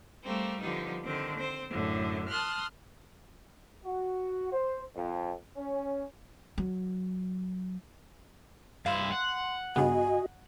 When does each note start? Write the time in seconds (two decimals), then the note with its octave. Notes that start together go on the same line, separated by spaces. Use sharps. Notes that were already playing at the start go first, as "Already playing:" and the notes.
0.24 G3 A3 A#3 C4
0.61 D3 F3 G3 B3 D#4
1.04 D3 D#3 C4
1.37 C4 C5
1.71 F#2 A2 D3
2.29 A5 C6 D#6 F6 F#6
3.85 F#4
4.52 C5
4.95 F2
5.56 C#4
6.58 F#3
8.86 G2 E4 F5 C6
9.12 F#5
9.76 G2 C#3 B3 F#4 D#5 G#5